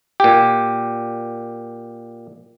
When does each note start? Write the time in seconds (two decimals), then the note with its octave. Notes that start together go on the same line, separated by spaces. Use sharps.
0.20 A#2 G4